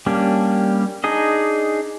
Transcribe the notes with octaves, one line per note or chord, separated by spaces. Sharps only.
G3 A#3 C#4 D4
D4 D#4 G#4 D#5